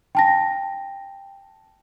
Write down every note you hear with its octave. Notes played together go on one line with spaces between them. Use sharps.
G5 A5 A#6